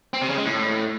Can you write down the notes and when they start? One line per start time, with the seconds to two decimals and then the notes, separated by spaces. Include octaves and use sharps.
0.14 C4
0.22 C3
0.30 C#3
0.38 G#3
0.46 A2